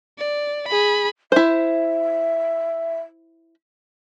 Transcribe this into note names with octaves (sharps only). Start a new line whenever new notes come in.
D5
G#4 B5
E4 C5 E5